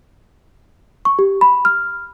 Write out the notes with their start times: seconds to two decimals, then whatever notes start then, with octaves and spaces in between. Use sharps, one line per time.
1.05 C#6
1.19 G4
1.41 B5
1.65 F6